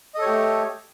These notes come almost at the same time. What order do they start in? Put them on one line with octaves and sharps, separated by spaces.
D#5 A4 C#5 G4 A3